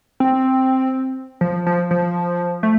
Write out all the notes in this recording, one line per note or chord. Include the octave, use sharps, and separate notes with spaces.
C4
F3
F3
F3
A3